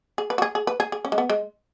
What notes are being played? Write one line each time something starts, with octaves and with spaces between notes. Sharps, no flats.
G#4
B4
F#4
G#4
G#4
B4
G#4
G#4
C#4
G#3
B3
G#3